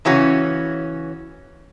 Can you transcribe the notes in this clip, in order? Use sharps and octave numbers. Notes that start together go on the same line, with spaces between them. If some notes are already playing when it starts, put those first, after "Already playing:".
C#3 E3 C#4 F#4